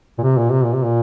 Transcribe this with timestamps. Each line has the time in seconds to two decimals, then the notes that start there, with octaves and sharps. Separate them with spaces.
0.18 A#2
0.23 C3
0.37 A#2
0.51 C3
0.64 A#2
0.74 C3
0.83 A#2